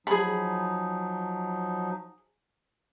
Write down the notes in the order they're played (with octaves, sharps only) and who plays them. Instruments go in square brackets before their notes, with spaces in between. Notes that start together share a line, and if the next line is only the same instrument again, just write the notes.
[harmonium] F3 F#3 D#4 [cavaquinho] G#4 B5